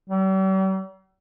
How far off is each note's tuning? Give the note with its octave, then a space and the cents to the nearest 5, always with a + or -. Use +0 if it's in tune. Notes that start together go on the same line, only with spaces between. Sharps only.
G3 -45